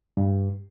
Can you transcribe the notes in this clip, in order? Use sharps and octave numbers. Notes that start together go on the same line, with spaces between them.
G2